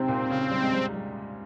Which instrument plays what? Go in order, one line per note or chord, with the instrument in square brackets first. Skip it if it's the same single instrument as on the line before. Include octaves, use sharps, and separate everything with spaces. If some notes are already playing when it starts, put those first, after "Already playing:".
Already playing: [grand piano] G#2 C3 [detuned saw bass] C4
[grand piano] A#2
C#3
G3
G#3
G3
G3